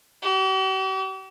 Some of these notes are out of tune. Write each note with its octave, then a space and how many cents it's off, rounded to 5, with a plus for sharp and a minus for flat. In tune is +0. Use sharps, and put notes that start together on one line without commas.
G4 -45